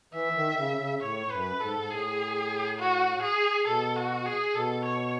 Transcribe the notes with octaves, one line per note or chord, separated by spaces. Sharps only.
E3 E5
D#3
C#3
C#3
A2 C#5
F#2 B4
G#2 A4
G#2
A2 G#4
F#4
G#4
B2 A4
F#4
G#4
B2 A4
C#5